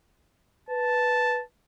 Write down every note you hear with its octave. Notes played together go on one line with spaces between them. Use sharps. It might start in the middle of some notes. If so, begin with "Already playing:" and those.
B4 A5